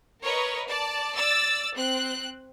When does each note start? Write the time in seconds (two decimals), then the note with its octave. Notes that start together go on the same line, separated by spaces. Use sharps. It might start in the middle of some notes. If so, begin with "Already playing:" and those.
0.22 A#4 B4 C#5 D#5
0.68 D5 A5
1.16 D5 E6 A6
1.75 C4 F#6